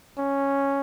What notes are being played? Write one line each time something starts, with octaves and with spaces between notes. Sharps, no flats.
C#4